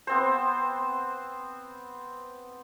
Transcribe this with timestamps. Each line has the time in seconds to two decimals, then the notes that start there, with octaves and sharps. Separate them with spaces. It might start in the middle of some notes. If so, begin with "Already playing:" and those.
0.07 B3 C4 C5